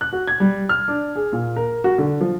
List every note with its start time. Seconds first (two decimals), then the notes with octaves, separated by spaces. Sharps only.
0.01 F#6
0.13 F#4
0.28 G#6
0.40 G3
0.69 F6
0.88 D4
1.16 G#4
1.32 A#2
1.56 A#4
1.84 F#4
1.98 D3
2.21 F3